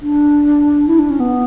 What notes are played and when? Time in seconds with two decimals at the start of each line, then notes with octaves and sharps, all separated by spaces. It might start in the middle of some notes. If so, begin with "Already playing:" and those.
0.02 D4
0.88 E4
0.99 D4
1.10 C#4
1.20 B3